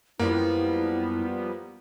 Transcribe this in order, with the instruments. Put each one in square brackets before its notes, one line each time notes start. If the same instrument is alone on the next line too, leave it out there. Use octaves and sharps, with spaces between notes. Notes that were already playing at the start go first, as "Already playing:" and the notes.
[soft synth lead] F#2 [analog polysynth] F3 G3 B3 [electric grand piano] A#3 [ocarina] E4